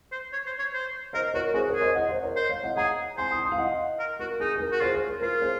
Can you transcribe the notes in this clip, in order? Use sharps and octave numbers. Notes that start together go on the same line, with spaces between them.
C5
C#5
C5
C#5
C5
A#4 C5 D#5
F#4 A#4 C#5
F#4 G#4 C5
A#4 C#5
G#4
C5 D#5
D#5 F#5
C5 D#5
A#4 C#5
C5
C#5 F5
D#5 F#5
G#4 F#5 A#5
C5 G#5 C6
C6 D#6
C6 D#6
F5
D#5 F#5
A#4
F#4 A#4
D#4 G#4
G#4
A#4
F#4
F4 G#4 C5
G#4 C5
A#4
F4 A#4
G#4 C5